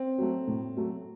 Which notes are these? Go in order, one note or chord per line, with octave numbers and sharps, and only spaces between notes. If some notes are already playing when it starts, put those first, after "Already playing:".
Already playing: C4
F#3 A3
A2
F#3 A3